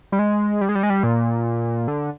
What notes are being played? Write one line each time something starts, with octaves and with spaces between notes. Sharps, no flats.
G3
G#3
G3
G#3
G3
G#3
G3
A#2
D3